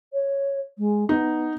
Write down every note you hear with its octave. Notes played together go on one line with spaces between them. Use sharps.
C#5
G#3
B3 D#4